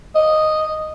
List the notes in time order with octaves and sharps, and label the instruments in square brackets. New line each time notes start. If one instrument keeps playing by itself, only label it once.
[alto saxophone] D#5